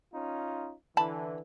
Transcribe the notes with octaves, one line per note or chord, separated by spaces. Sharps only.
C#4 D#4 F4
D3 E3 A5 B5